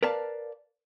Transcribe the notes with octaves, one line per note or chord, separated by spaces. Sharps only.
A#4 B4 D5 F5 A5